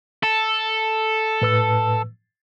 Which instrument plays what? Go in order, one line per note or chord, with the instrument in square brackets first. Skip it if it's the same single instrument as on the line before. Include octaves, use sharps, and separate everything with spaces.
[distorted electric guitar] A4
[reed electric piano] A2 B4 E6